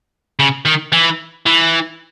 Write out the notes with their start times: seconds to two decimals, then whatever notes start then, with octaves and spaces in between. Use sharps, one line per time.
0.39 C#3
0.65 D#3
0.92 E3
1.46 E3